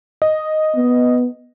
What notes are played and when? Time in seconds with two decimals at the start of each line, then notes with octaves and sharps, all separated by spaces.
0.22 D#5
0.76 B3